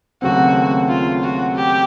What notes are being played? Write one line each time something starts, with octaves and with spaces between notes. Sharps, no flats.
D#2 C#3 F#3 A3 C4 F#4
F4
F#4
G4